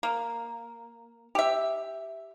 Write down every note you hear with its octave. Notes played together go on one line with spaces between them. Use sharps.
A#3
G4 E5